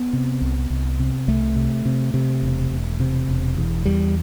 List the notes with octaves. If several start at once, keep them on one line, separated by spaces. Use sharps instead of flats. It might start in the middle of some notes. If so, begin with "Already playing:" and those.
Already playing: B3
C3
C2
C2
C3
C2 A3
C3
C3
C3
E1
E1
C3
E1
E2
E2 G3